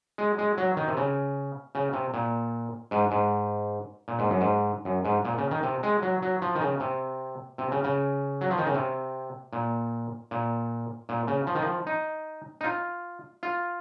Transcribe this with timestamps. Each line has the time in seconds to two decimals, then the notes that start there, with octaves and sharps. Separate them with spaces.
0.18 G#3
0.38 G#3
0.58 F#3
0.77 D#3
0.87 C3
0.97 C#3
1.75 C#3
1.93 C3
2.14 A#2
2.91 G#2
3.11 G#2
4.08 A#2
4.19 G#2
4.30 F#2
4.41 G#2
4.85 F#2
5.05 G#2
5.25 A#2
5.38 C#3
5.51 D#3
5.63 C3
5.83 G#3
6.02 F#3
6.22 F#3
6.42 F3
6.55 D#3
6.61 C#3
6.80 C3
7.58 C3
7.72 C#3
7.84 C#3
8.41 F#3
8.51 F3
8.58 D#3
8.66 C#3
8.74 C3
9.53 A#2
10.31 A#2
11.09 A#2
11.28 C#3
11.47 F3
11.55 D#3
11.62 F3
11.87 D#4
12.61 D#4
12.64 F4
13.43 F4